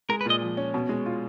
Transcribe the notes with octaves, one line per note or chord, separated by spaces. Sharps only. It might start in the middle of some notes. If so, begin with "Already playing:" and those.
G#3 A#4
B4
A#2 D#5
F3
C#4
B2
G#3
F4